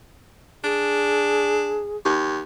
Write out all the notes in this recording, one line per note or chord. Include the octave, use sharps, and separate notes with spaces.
D4 G#4
D#2